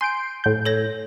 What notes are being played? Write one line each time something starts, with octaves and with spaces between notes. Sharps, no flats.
G#5 C6 G6 D7
A2 G6
A4 C#5 A#6